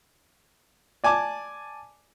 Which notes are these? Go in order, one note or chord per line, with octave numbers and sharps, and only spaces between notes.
D5 G#5 A5 D6